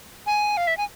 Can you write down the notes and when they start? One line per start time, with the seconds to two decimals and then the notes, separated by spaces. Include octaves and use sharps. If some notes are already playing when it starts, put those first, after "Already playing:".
0.26 G#5
0.57 F5
0.67 E5
0.77 G#5